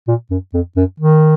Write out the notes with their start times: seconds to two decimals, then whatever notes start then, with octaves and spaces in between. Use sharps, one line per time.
0.08 A#2
0.30 F#2
0.54 F2
0.76 F#2
0.99 D#3